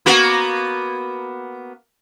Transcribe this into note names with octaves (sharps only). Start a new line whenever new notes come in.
A#3 B3 F#4